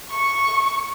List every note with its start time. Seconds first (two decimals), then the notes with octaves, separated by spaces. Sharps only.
0.10 C#6